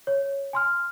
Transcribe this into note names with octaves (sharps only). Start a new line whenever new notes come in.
C#5
G#5 C6 F6